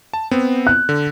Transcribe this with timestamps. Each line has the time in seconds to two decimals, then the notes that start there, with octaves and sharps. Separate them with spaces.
0.13 A5
0.31 B3 C4
0.67 F#6
0.89 D3